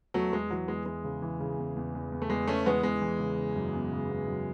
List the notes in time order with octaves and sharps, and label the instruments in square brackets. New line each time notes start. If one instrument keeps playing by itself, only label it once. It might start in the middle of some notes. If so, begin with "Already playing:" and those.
[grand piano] E2 [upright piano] F#3 A3
[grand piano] E2 [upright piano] G#3
[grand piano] E3 [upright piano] F#3
[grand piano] E2 [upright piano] G#3
[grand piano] E3 [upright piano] G#3
[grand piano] C#3
E3
C#3
E2
E2
E2
E2
[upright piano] A3
[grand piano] E2 [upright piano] G#3
[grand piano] E2 [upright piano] A3 C#4
[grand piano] E3 [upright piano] G#3 B3
[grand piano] E2 [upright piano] G#3
[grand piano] E3
C#3
C#3
F#2
B3
C#3
B3
F#2